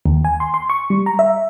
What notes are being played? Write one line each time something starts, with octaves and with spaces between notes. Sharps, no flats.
D#2
G#5
C6
C6
C#6
G3
A#5
E5